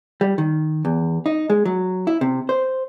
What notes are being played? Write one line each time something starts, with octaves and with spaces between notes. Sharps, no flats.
G3
D#3
E2
D#4
G#3
F#3
E4
C3
C5